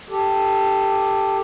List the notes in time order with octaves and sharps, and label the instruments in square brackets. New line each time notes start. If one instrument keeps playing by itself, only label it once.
[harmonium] G4 A4